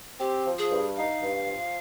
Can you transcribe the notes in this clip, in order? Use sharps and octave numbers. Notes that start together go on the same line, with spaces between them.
C4 G4
F3
G#4
G2
D#4 F5
G2
F3